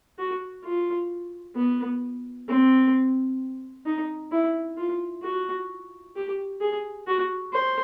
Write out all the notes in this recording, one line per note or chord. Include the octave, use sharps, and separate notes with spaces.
F#4
F4
B3
C4
D#4
E4
F4
F#4
G4
G#4
F#4
C5